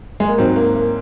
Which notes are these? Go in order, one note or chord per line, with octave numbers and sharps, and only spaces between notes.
G#3
A#3
G#2 F#3 C4
A#3
A#3